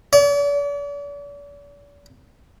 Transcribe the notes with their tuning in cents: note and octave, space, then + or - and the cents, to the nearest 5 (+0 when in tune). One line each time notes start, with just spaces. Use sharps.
D5 -45